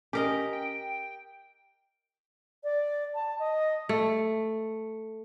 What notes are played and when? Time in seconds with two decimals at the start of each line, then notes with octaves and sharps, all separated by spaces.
0.13 C#4 G4 A#4 D#5
0.53 G5
2.64 D5
3.14 A5
3.39 D#5
3.89 A3